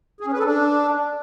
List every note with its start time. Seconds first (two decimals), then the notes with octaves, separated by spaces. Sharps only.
0.20 G#4
0.27 C#4
0.33 B4
0.39 A4
0.45 D4